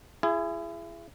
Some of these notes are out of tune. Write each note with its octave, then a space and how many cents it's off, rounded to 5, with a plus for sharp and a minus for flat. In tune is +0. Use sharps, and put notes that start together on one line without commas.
E4 +35 G#4 -5